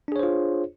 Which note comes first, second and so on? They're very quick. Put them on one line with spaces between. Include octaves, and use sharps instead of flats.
D4 G#4 C#5 C5 F4